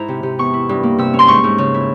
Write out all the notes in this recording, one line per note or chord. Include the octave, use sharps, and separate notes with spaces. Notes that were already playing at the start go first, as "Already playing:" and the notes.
Already playing: G#2 E4 C5 A#5
C3
C3
E2 C#6
E4
G2
A#3
C3 E6
C#4
C6
G#2 C#6
G#2
C#3
E4